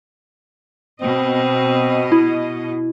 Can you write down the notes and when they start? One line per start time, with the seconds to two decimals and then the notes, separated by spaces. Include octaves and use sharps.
1.01 B2 C4 D#5
2.12 E4